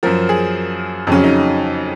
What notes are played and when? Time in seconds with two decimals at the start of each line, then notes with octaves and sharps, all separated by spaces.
0.03 F#2 F3 A#4
0.29 G#4
1.07 F2 C#3 F#3 C#4
1.24 D#4